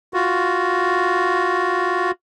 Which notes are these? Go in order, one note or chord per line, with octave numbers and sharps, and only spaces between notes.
F4 F#4